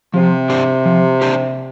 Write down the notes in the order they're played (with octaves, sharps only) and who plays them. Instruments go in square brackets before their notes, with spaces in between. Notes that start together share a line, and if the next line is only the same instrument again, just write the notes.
[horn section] C3 [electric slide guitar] F3
[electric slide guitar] D4 G4 C5
F3
D4 G4 C5